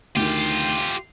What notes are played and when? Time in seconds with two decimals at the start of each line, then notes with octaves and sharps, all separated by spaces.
0.16 D2 D#3 F4 G4